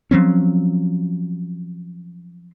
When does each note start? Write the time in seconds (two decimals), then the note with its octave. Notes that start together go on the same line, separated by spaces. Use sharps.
0.11 F3 F#3 C4 C#4